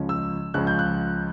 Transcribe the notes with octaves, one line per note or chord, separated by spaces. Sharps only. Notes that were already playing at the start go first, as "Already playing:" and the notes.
Already playing: C#2 C#3 F3 G#3 C#4
E6
C#2 C#3 F3 G#3 C#4 F#6
G6
F#6